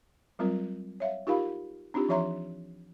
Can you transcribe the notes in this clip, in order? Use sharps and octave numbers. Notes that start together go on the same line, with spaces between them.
F#3 G3 C4 F4 A#4
C#5 E5 F5
D#4 F4 G4 A#4 F5 B5
C4 D4 D#4 F4 G4
E3 F3 C#5 E5 A#5 C6